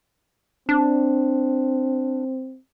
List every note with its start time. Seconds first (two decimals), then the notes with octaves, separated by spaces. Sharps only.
0.69 C4 D4